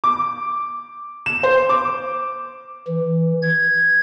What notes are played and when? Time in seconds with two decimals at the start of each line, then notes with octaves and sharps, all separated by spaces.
0.04 D6
1.26 E7
1.43 C5
1.69 D6
2.87 E3
3.42 G#6